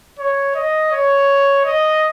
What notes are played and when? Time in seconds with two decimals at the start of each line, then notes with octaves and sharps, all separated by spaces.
0.19 C#5
0.55 D#5
0.92 C#5
1.65 D#5